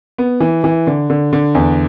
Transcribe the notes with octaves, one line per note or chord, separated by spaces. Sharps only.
B3
E3
E3
D3
D3
D3
E2